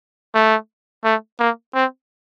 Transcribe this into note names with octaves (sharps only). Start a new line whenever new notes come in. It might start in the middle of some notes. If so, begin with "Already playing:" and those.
A3
A3
A#3
C4